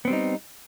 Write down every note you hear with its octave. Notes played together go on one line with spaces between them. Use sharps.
G3 B3 C4 D#4